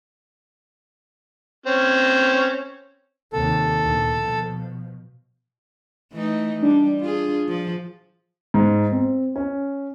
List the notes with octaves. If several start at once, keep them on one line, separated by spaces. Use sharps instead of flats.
C4 C#4
D#2 C3 A4
D2 A#2
B2 F3
E3 A3 D#4
G3 D4
F4 G#4
F3
G#2
C4
C#4